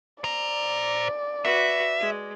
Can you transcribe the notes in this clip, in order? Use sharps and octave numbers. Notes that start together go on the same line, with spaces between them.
C5 D5 A#5
F#4 B4 E5
G#3